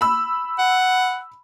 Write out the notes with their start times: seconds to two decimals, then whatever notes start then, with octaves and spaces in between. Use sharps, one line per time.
0.01 B5 E6
0.59 F#5